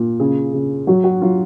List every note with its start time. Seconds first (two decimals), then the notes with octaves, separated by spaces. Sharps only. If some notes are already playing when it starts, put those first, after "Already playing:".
Already playing: A#2
0.20 C#3 G#4
0.53 C#3
0.87 F#3 F#4
1.04 F#4
1.22 F#3 F4